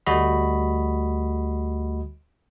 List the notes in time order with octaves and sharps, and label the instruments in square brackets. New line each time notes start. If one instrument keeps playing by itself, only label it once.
[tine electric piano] D2 G3 A3 F#4 D#5 B5